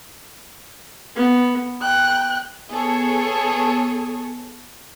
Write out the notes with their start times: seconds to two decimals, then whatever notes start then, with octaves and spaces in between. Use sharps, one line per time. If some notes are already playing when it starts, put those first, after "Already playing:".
1.16 B3
1.82 G5 F#6
2.70 B3 G#4 A4 C#5